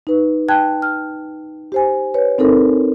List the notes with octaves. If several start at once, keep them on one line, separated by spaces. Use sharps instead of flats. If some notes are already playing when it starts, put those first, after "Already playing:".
D#4 B4
G5 A5 F#6 G#6
F6
G4 C5 G#5
B4 C#5
C4 D#4 A4 A#4